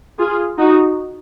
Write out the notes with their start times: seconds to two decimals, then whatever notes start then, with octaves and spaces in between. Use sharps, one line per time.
0.19 F4 G#4
0.58 D#4 F#4